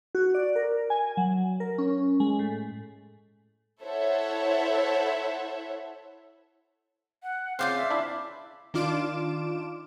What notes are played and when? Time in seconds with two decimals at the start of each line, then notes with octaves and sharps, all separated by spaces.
0.15 F#4
0.34 D5
0.56 A#4
0.90 G#5
1.17 F#3
1.60 A#4
1.78 C#4
2.20 G#3
2.39 A2
3.82 E4 A4 C5 C#5 E5 F#5
7.23 F#5
7.59 C#3 C4 F4 D5 F5 G6
7.76 E5
7.91 D4 E4 E5
8.74 D#3 D4 F4 D6 D7 E7